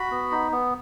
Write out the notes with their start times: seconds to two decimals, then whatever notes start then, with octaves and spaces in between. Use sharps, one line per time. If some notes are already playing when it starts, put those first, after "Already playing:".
Already playing: F#4 B5
0.11 B3
0.31 D#4
0.52 B3